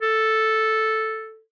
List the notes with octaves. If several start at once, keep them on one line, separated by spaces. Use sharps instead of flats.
A4